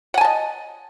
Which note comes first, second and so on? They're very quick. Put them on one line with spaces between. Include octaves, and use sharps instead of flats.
F#5 G#5 A5 D#5